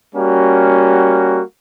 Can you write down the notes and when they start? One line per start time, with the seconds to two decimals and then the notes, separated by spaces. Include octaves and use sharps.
0.15 G3 A#3 C#4 F#4